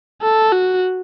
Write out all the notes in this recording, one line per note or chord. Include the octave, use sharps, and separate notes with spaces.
A4
F#4